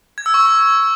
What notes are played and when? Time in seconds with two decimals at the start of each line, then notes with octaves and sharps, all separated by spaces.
0.18 G#6
0.26 E6
0.34 C#6